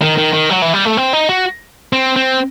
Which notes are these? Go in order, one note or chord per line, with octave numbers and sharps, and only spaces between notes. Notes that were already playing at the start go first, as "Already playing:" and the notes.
D#3
D#3
D#3
F#3
E3
G3
A3
C4
D#4
F#4
C4
C4